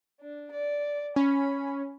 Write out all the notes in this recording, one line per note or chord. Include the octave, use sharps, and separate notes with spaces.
D4
D5
C#4 B5